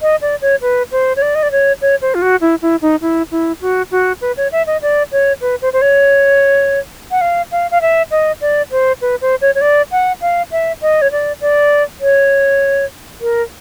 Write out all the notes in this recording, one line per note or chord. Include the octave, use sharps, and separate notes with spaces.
D#5
D5
C#5
B4
C5
C#5
D5
D#5
D5
C#5
C#5
C5
F4
F#4
E4
E4
D#4
E4
E4
F#4
F#4
B4
C#5
E5
D#5
D5
C#5
B4
C5
C5
C#5
F#5
F5
F5
F5
E5
D#5
D5
C5
B4
C5
C#5
C#5
D5
F#5
F5
E5
D#5
C#5
D5
D5
C#5
A#4